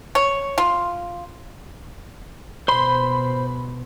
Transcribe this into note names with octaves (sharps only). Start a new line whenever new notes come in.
C#5
F4
B2 C5 B5 C6